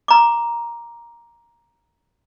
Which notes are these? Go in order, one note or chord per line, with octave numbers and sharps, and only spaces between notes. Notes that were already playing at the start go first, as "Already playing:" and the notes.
A#5 D6